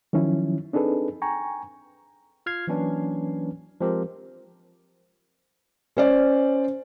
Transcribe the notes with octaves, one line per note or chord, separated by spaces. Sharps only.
D#3 F3 F#3 C#4 E4
C4 D4 D#4 G#4 A4 B4
G5 G#5 A#5 C#6
F4 F6 G#6 C7
E3 F#3 A#3 C#4 D4 B4
F3 G#3 C4 G4 A#4
C#4 C5 D5